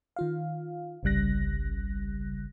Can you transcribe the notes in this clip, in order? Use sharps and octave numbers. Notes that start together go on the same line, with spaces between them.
D#3 F4 F5
G1 C2 C#3 G3 F#6 A#6